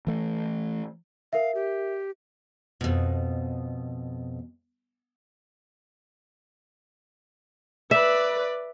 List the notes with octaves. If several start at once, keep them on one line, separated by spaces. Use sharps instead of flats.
E3 A3
A#4 E5 F5
G4
F2 B2
B4 D5 E5